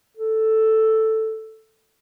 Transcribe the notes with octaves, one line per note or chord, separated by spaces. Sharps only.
A4